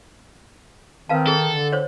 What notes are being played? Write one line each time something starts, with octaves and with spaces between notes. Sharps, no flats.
D#3 C4 B4 F5 A5
G#4 A4
D3
C5 C#5